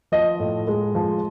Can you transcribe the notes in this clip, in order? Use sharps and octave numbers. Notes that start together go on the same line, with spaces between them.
F3 D#5
A2
G#3
F3